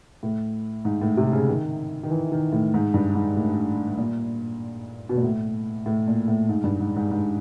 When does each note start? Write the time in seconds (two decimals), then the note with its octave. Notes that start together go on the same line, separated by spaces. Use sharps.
0.23 A2
0.85 G#2
1.01 A2
1.17 C3
1.33 C#3
1.48 D#3
2.03 D#3
2.10 E3
2.32 D#3
2.52 A2
2.74 G#2
2.94 G2
3.15 G#2
3.36 A2
3.98 A#2
5.09 B2
5.16 A#2
5.23 A2
5.86 A2
6.07 A#2
6.28 A2
6.49 G#2
6.64 G2
6.80 G#2
6.96 G#2
7.11 G#2